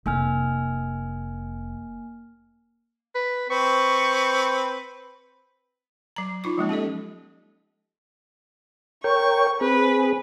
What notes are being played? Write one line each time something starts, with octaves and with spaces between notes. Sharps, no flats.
F1 A#3 G#5 F6
B4
C4 B4 C#6
F#3 A#5
D#4 F4 D6
F3 G#3 A#3 C#4
C#4 G4 A4 D#5
A#4 C#5 G5 C#6
C4 G#4 B4